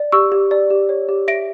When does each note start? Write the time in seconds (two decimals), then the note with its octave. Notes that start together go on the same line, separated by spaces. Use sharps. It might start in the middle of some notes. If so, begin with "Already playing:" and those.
Already playing: D5
0.12 G4 C#6 E6
0.32 G4
0.51 D5
0.70 G4
0.89 C#5
1.09 G4
1.28 E5 A#6 D7